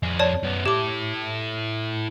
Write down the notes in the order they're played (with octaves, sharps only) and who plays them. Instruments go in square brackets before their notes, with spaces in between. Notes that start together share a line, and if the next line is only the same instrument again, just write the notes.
[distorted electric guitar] F2 G#4
[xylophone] C#5 D5 A5
[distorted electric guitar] F#2 B3
[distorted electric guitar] E4 A4 [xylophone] G4 D6